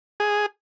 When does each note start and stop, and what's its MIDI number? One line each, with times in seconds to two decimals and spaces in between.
0.20 0.46 68